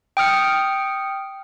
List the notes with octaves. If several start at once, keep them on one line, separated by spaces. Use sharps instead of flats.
G5 D#6 F6 C#7